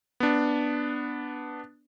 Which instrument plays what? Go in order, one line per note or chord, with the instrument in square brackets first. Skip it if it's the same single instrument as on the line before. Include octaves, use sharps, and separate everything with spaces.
[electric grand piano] B3 D4